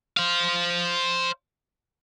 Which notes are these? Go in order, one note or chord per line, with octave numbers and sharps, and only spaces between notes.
C5 F5